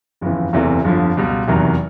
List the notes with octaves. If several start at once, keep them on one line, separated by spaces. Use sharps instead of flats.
G1 F2 C#3 E3
F#1 E2 C3 E3 A3
G1 F2 D3 F3
C#2 B2 G3
F1 E2 C3 D#3 F#3